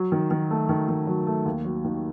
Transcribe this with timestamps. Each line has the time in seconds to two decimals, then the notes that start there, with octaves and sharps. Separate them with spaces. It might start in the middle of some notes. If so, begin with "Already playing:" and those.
Already playing: F#3
0.12 D#3
0.31 D#3
0.51 A3
0.69 D#3
0.89 D#3
1.07 F#3
1.27 A3
1.46 D#2
1.65 F#3
1.84 D#3